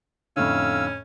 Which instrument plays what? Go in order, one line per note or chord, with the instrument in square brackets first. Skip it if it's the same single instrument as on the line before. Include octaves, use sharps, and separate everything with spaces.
[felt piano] F2 A2 D3 [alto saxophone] C#4 [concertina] F5 E6